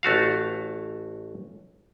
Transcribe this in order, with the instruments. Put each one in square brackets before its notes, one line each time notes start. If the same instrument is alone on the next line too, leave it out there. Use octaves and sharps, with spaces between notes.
[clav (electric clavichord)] A1 A3 F#4 F5